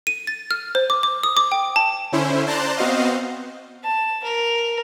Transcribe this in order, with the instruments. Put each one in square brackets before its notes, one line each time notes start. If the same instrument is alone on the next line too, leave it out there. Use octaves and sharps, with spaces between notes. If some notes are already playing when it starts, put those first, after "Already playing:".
[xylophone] D#7
A6
F6
C5
D6
D6
D#6
D6
G5
A5
[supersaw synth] D3 C#4 E4 C5
C5 D5 A5 A#5 C6 F#6
B3 C4 F#4 C5 D#5 F5
[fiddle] A5
A#4